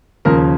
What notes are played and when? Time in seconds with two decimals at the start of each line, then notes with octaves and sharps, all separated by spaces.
0.25 D#2 C#3 F3 A#4